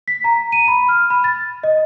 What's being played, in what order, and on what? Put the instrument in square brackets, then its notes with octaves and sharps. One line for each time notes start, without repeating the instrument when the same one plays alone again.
[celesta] B6
A#5
D#7
B5
F6
B5
A6
D#5